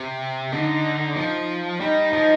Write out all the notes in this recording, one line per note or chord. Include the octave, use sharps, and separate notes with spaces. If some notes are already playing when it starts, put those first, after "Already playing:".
Already playing: C3
D3 D#4
F3
G3 D#4
F3